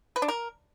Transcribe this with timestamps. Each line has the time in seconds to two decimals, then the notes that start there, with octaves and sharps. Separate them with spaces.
0.16 B4
0.22 D4
0.28 A#4